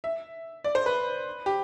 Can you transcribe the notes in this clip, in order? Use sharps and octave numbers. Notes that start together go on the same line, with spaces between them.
E5
D5
C5
B4
G4